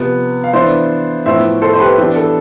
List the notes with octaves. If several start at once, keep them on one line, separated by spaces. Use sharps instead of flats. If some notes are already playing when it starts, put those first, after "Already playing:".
Already playing: C3 F3 B3
F5
E3 B3 D4 C5 E5
A2 F3 B3 E4 C5 E5
A4 C5
C5
G4 B4
E3 B3 D4 G4
A4